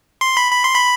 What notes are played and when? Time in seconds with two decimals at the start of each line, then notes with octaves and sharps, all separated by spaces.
0.21 C6
0.37 B5
0.51 B5
0.64 C6
0.74 B5